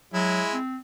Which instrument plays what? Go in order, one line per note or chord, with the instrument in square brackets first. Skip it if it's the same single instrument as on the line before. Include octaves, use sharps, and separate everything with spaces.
[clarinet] F#3 [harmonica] G#3 E4
[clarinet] C4